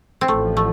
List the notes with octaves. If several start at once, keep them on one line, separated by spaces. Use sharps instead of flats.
C4
A1 A2 F3 A3
A3